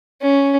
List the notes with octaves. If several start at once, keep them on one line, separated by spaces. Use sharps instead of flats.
C#4